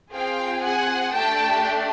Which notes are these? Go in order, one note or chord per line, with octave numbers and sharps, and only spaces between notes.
C4 F4 G#4 F5 G5
F#5 G#5
A3 D4 G4 G5 A5